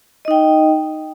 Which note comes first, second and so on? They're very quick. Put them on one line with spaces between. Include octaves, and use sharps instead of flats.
D#5 D#4 G5